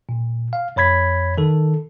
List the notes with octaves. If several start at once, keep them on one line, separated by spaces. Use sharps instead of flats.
A#2
F5
F2 C#5 B5 G#6 B6
D#3 A4